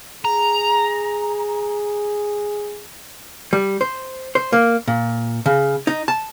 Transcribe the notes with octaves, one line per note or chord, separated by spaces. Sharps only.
G#4 A#5
G3
C5
C5
A#3
A#2
C#3
D#4
A5